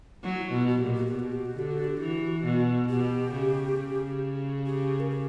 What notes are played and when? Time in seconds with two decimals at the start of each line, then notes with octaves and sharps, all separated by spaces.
0.24 F#3 F#4
0.37 E4
0.51 B2 F#4
0.68 F#4
0.81 A#2 G4
0.94 F#4
1.06 G4
1.12 B2
1.20 F#4
1.32 G4
1.45 F#4
1.57 D3 G4
1.71 F#4
1.84 G4
1.97 E3 F#4
2.45 B2
2.89 B2 G4
3.33 C#3
3.77 C#3
4.66 G4
5.00 A#4
5.10 G4